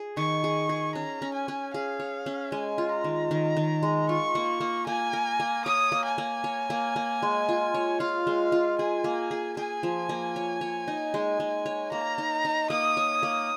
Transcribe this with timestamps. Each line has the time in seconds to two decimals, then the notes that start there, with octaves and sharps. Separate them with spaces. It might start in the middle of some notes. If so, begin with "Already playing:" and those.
Already playing: G#4
0.17 D#3 C#6
0.44 G#4
0.69 G#4
0.95 C#4 A#5
1.22 C#4
1.34 G#5
1.48 C#4
1.74 G#4 F5
2.00 C#5
2.26 C#4
2.52 G#3 G#5
2.78 F4
2.91 A#5
3.04 D#3
3.31 D#3
3.57 D#3
3.83 G#3
4.09 F4 C#6
4.35 A#3
4.61 A#3
4.87 A#3 G#5
5.13 A#4
5.40 A#3
5.66 C#5 D#6
5.92 A#3
6.05 G#5
6.18 A#3
6.44 C#5
6.70 A#3
6.96 A#3
7.22 G#3
7.49 F4
7.74 C#5
8.00 F4 F5
8.27 G#3
8.52 F4
8.79 G#4 G#5
9.04 A#3
9.31 G#4
9.57 G#4 G#5
9.83 F3
10.09 A#3
10.36 C#5
10.61 C#5
10.88 D#4
11.14 G#3
11.40 G#3
11.66 C#5
11.92 A#3 A#5
12.18 D#4
12.45 D#4
12.70 A#3 D#6
12.97 C#5
13.23 A#3